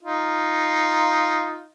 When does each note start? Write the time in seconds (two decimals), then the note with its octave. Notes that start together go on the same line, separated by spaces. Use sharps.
0.03 D#4 F4